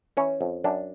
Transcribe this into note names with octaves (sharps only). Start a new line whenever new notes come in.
E3 C#4
F2
F#2 D4